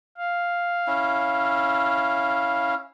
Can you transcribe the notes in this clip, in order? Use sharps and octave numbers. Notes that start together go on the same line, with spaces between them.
F5
C#4 E4